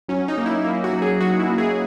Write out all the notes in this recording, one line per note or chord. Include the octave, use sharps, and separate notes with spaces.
F#3 C#4
D#4
A#3
E4
A#3 E4
F#4
F#3
G#4
F#3 F#4
E4
A#3
G#4